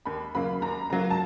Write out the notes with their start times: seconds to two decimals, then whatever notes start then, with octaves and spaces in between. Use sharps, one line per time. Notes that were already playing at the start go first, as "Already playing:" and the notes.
0.05 D#2 B5
0.35 C#3 F#3 A#3 B5
0.62 D#2 A#5
0.90 C#3 F#3 A#3 A#5
1.10 A5